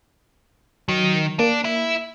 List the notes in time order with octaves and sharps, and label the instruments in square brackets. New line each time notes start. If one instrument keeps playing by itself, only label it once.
[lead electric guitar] D#3 [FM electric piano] F#3
[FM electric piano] A#3 [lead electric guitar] D4
[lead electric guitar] E4